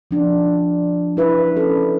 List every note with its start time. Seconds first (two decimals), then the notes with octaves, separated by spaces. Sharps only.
0.11 F3 D4
1.17 E4 B4 E5
1.56 C#4 A4